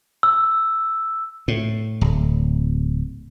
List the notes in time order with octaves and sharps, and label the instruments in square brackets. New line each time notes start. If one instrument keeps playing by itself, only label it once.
[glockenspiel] E6
[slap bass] A2
D1